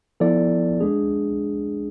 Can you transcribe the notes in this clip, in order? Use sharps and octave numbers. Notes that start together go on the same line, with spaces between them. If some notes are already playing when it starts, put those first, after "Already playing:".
F3 B3 E4 A4 D5
G#3 D4 G#4